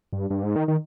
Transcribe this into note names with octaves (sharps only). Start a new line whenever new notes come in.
G2
G2
G#2
D#3
D#3